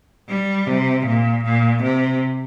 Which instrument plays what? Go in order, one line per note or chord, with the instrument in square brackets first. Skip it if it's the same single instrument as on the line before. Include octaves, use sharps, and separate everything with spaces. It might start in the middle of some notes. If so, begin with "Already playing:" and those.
[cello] G3
C3
A#2
A#2
C3